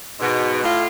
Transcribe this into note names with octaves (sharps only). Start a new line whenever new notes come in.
G#2 B2
A2 F4